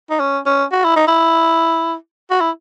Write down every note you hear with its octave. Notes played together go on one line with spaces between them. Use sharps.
D#4
C#4
C#4
F#4
E4
D#4
E4
F#4
E4